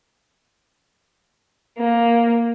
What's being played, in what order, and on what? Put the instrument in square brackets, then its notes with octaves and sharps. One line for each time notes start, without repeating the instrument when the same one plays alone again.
[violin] A#3